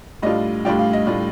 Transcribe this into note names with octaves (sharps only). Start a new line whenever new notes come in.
A2 G3 D4 F4 D#5
A2 G3 D4 F4 G5
F5
D#5
A2 G3 D4 F4